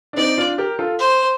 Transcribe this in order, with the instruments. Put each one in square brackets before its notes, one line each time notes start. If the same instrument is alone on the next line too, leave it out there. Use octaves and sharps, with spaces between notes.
[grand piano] D4
[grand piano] C4 D#4 [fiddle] D5
[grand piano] D4 F4
G4 A#4
F4 A4
[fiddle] C5